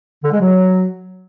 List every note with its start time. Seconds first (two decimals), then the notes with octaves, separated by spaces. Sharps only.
0.24 D3
0.32 G#3
0.40 F#3